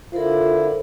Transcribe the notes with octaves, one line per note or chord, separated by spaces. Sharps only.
D3 E4 F4 A4 A#4 C5